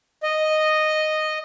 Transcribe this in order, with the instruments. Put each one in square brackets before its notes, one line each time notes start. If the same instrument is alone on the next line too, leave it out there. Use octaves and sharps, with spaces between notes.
[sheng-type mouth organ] D#5